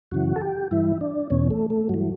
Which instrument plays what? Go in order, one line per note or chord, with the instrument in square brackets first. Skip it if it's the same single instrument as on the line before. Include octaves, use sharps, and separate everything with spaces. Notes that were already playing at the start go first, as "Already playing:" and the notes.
[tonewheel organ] F#2 C#3 E3 F#4
A4
G4
G2 E3 E4
D4
E2 B2 C#4
A3
A3
G2 E3 F#3